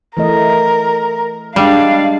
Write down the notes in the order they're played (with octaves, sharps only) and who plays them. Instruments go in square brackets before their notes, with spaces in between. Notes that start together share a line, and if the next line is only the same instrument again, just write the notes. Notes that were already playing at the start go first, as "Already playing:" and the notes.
[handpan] E3 A3 D#5 [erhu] A#4
[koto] G3 [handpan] G#3 [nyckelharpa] D4 [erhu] F5